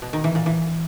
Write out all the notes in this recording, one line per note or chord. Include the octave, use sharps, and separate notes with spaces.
B2
D#3
E3
A#2
E3